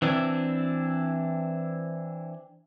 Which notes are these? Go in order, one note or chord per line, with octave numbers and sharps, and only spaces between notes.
E3 C4 D4 E4